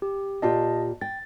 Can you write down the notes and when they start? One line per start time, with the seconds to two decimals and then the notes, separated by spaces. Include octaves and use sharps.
0.02 G4
0.42 A#2 F4 G4 D#5 A5
1.01 G5 A6